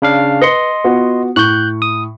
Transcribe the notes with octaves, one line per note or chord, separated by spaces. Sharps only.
C#3 D4 F5
B4 D#5 C6 C#7
B3 F4 F#4
A2 C#6 F#6 G6
D#6